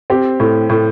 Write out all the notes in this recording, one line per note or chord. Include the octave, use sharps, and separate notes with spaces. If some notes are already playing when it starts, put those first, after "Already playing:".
C4 G4
A2
A2